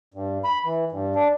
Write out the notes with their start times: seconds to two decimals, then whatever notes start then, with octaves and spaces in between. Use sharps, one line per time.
0.14 G2
0.44 B5
0.65 E3
0.92 G2
1.15 D4